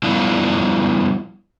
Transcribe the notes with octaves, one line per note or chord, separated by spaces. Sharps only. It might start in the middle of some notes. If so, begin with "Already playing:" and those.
F3 G3 B3 D4 E4 F4